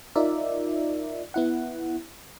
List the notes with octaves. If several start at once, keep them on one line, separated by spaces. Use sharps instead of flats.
D#4 F4 A#4 D5 E5
B3 E4 F#5